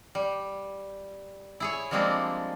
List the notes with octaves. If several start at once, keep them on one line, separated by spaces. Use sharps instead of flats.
G3
E4 G#4 C#5
F3 G3 G#3 A#3 C4 D4